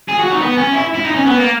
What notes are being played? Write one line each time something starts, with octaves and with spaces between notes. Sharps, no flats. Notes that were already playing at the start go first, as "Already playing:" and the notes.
G#4
F#4
D#4
B3
C#4
E4
E4
D#4
C#4
B3
A#3